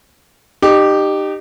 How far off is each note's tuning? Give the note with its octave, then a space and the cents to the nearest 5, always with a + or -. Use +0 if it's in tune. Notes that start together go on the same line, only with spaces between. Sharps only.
D#4 -30 G4 +0